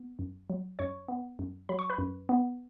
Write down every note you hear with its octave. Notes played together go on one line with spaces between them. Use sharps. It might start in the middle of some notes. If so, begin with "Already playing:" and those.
Already playing: B3
F#2
F#3
F#2 C#5 C#6
B3
F#2
F#3 B5
C#6
B4 B5
F#2
B3